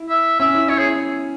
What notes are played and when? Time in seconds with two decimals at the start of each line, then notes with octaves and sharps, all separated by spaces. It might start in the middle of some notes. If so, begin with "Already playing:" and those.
Already playing: E4
0.09 E5
0.40 C#4 E5
0.55 E4
0.68 E4 C#5
0.79 G#4